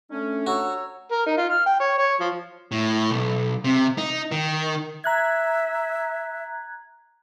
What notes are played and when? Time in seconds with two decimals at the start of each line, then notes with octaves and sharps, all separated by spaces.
0.11 A3 C#4 D4
0.47 F#4 C#5 A#5 E6
1.12 A#4
1.26 D#4
1.37 F4
1.50 F6
1.66 G5
1.80 C#5
1.98 C#5
2.20 F3
2.71 A2
3.11 B1
3.64 C3
3.98 D#4
4.31 D#3
5.04 E5 A#5 F#6 G#6